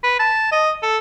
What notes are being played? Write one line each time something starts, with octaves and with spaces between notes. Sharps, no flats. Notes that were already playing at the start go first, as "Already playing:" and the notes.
B4
A5
D#5
A4